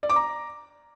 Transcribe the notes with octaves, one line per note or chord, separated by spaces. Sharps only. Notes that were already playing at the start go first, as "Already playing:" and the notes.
D5
D6
A#5